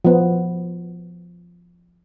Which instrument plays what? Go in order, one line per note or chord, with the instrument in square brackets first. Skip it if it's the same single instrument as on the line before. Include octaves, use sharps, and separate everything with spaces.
[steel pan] F3 B3